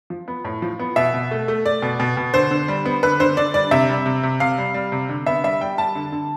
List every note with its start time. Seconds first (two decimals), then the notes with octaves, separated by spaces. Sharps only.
0.10 F3
0.28 B3
0.45 A2
0.62 F3
0.79 B3
0.96 B2 E5
1.14 B2
1.31 A3
1.48 A3
1.66 A3 D5
1.82 B2
2.00 B2
2.17 B2
2.34 D3 C5
2.51 D3
2.68 G3
2.85 B3
3.03 D3 B4
3.20 D3 C5
3.37 D3 D5
3.54 G3 D5
3.71 C3 E5
3.89 G3
4.06 C3
4.23 C3
4.40 C3 F5
4.58 G3
4.74 G3
4.92 C3
5.09 D3
5.26 B3 E5
5.43 G3 E5
5.61 G3 G5
5.78 G3 A5
5.95 D3
6.12 D3